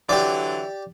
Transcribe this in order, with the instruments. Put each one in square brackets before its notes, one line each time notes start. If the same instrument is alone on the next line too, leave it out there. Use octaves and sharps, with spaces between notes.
[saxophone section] D3 E3 F#3 [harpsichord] G4 D5